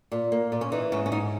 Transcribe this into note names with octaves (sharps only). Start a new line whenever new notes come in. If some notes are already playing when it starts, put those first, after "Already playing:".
A#2
A#3
A#2
C#4
E3 D#4
G#2 C#4
C#4
G#2 D#4